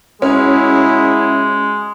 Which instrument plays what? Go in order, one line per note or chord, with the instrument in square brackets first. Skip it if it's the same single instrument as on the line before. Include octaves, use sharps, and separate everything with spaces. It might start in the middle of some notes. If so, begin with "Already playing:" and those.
[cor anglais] G#3 [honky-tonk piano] C#4 [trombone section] E4 F#4 G#4